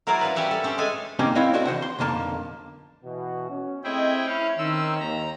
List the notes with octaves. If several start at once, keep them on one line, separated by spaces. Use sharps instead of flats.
F#3 E4 A#4 C5 D5 G#5
C#4 F4 B4
G3 C#4 G4 E5 F#5 G#5
A4
C4 C#4 G4
G#3 A3 G#4 A4 G#5
A#3 C4 C#4 D#4 G4
C4 E4 C#5 D#5 F5 F#5
C4 D4 F#4 A4 D#5 E5
E3 F3 C5 F#5
C6
B1 F2 D3 A#3 A5
B2 E3 F#4
C#4
A3 C4 E4 G#4 D#5 G5
C#4 E4 C#5 F5
D#3 C4 C#4 E6
D#2 A#5